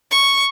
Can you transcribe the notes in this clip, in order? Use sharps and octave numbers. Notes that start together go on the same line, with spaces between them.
C#6